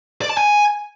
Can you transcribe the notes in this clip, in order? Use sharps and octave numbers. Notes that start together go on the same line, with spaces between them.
D5
A5
G#5